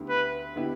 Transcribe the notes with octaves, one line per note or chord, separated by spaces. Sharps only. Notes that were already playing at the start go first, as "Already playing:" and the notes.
Already playing: D2 D3 B3 E4 G4
B4
D3 B3 E4 G4